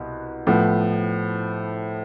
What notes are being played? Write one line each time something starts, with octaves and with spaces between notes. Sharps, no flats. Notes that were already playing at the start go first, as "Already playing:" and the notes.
Already playing: C2 B2
A2 F3 B3